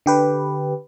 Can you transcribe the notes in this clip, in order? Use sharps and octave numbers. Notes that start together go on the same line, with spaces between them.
D3 G4 B4